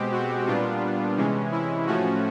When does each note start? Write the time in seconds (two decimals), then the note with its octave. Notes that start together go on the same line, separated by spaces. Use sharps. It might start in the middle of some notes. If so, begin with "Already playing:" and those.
Already playing: B2 G#3 C4 G4
0.12 F#4
0.46 A#2 G3 B3 D4 F4
1.17 C3 E3 G#3 C#4
1.52 E4
1.87 A2 F3 A3 C#4 F#4